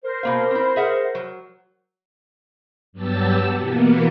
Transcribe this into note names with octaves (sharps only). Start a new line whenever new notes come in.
A#4 C5
B2 A#3 F5
C4 E4
G#4 E5 F#5
F#3
G2 F#3 B3 G4 A5 E6
B2 E3 A#3 B3